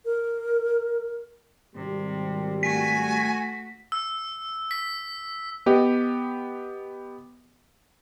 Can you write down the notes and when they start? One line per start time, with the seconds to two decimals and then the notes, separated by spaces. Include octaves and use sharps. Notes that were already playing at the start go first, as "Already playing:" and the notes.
0.05 A#4
1.75 G#1 C3 G3
2.63 A3 F#4 G#5 B6
3.92 E6
4.71 B6
5.66 B3 G4 D#5